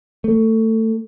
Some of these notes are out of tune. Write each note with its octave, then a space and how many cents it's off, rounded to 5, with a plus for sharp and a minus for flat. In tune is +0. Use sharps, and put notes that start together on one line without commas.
A3 +20